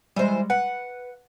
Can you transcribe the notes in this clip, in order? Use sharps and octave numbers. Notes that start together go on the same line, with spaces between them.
E3 G3 G#3 C5
B4 F#5